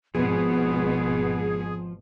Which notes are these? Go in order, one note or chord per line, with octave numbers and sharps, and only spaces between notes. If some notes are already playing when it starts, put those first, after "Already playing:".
G#1 B2 F3 B3 G#4